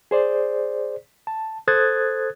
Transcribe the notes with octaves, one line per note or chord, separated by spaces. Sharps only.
G#4 C5 D5
A5
A4 C5 D#6 F#6 G#6 A6